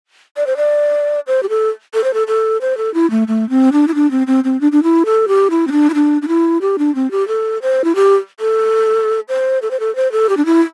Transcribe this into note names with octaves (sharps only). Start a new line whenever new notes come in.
D5
C5
D5
C5
G4
A4
A4
C5
A4
A4
C5
A4
E4
A3
A3
C4
D4
E4
D4
C4
C4
C4
D4
D4
E4
A4
G4
E4
C4
D4
E4
D4
D4
E4
G4
D4
C4
G4
A4
C5
E4
G4
A4
C5
A4
C5
A4
C5
A4
G4
D4
E4